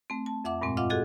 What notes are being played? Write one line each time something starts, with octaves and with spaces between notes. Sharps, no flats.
A3 C4
A5
F2 E5 F#5 D6
G2 A#2 G#3 C4
F4 D#5 F5 F#5 D6
F#4 G#4 A4 D#5 F#5